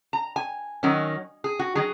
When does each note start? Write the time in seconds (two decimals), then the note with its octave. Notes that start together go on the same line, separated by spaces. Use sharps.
0.13 A#5
0.36 G#5
0.83 D#3 F#3 C#4
1.44 G#4
1.59 F#4
1.75 D#3 F#3 G#4